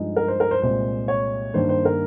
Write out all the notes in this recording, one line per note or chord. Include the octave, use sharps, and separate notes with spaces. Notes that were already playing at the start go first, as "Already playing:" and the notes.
Already playing: G2 F3 G#3 D#4
A#4
C5
A#4
C5
C2 A#2 G#3 C5
C#5
G2 D#3 A#3 C5
C5
A#4